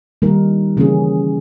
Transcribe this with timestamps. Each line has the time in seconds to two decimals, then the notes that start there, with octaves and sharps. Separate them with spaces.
0.22 D#3 G3 A#3 D#4 A#4
0.77 C#3 E3 A#3 C#4 G#4